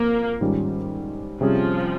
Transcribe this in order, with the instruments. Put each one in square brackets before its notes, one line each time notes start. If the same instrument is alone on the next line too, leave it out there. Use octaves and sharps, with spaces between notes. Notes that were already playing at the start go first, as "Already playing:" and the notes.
Already playing: [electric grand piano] A#2 F3 C4 [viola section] A#3
[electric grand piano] G#2 D#3 G3 C#4 F4
[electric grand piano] C3 G3 C#4 G#4 [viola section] F3